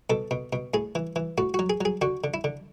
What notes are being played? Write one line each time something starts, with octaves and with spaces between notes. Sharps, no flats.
B2 A4
B2
B2
A2 G#4
E3
E3
A2 F#4
F#3 F#4
G#4
F#3 G#4
D3 F#4
D3
E4
D3